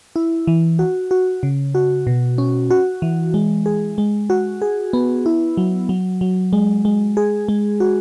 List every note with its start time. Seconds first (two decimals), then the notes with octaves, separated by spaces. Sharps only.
0.16 E4
0.47 E3
0.79 F#4
1.11 F#4
1.43 C#3
1.75 F#4
2.07 B2
2.38 C#4
2.71 F#4
3.02 E3
3.34 G#3
3.66 G#4
3.98 G#3
4.30 F#4
4.62 G#4
4.93 B3
5.26 E4
5.57 F#3
5.89 F#3
6.21 F#3
6.53 G#3
6.85 G#3
7.17 G#4
7.48 G#3
7.80 F#4